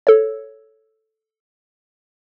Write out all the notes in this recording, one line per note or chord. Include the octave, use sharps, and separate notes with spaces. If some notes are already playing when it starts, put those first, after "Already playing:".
A4 C#5